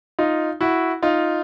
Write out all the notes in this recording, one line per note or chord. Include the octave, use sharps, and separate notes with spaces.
D#4 F4
E4 F#4
D#4 F4